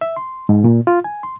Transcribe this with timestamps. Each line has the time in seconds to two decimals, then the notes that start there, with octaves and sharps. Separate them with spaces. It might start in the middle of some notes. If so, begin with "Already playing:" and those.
0.01 E5
0.16 C6
0.49 G#2
0.64 A#2
0.87 F4
1.04 G#5
1.23 C6